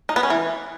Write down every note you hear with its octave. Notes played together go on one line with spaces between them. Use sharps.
D#4
B3
C#4
E3